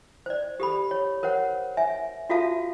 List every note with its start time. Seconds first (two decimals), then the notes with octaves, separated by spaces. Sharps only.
0.26 C5 D5
0.60 G4 A4 B5
0.91 C#5
1.23 A#4 C5 C#5 F#5
1.77 E5 G#5
2.29 F4 F#4 A4 E5 F5 A5